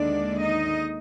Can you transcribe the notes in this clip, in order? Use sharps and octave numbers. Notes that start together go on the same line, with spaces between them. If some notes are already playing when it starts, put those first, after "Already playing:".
Already playing: D#2 D3 G#3 D4 D5
D#4 D#5